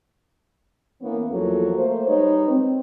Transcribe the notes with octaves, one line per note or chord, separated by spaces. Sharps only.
E3 A#3 B3 C#4
E2 F3 F#3 A#3 A4
A3 A#3 C5
G3 G#3 D#4 B4 C#5
C4